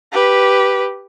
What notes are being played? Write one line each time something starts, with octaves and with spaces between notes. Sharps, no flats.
G4 B4